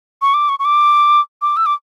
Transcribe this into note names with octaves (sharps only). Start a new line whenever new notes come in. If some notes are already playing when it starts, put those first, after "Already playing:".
C#6
D6
C#6
C#6
D6
D6
E6
D6